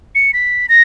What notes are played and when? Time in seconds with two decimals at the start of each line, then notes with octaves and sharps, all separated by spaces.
0.15 C#7
0.33 B6
0.69 A#6